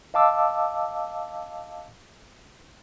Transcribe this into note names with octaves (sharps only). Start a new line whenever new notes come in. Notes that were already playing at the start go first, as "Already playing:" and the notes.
D#5 F5 A5 D6 E6